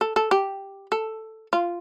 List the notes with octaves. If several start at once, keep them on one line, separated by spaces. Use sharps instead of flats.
A4
A4
G4
A4
F4